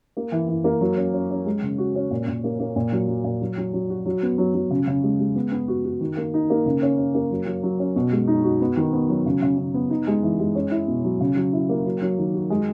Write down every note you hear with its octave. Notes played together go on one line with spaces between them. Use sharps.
A#3
E3
E3
A#3
F#3
C#4
C#4
C#4
G#3
C#3
F#4
C#4
A#2
A#2
A#3
A#3
A#2
F#3
F#3
A#2
F#3
F#3
F#3
F#4
F#3
B3
F#3
F#3
C#3
C#3
G#3
G#3
B3
B3
F#4
F#4
D#3
A#3
D#4
A#3
C#3
C#4
C#4
A#3
F#3
F#3
F#3
C#4
B2
G#3
D#4
F#4
B3
D#3
B3
F#3
C#3
C#3
C#3
B3
D#4
G#3
E3
G#3
C#4
E4
B2
F#3
C#3
F#3
E4
A#3
F#3
F#3
D#3
F#4
G#3